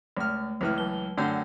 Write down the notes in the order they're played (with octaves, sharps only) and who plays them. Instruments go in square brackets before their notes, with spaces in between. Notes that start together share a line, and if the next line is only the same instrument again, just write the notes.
[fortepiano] C#2 F6 [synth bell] A3
[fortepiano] C#2 E3 F6
[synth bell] F#3 G7
[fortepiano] F#2 D3 [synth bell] A3 G5 G6